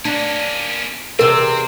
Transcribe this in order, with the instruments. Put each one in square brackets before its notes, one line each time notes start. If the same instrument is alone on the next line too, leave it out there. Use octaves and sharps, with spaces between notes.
[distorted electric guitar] A#3 C#4 [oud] D4
[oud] E2 C3 [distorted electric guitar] C4 [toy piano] A#4 E6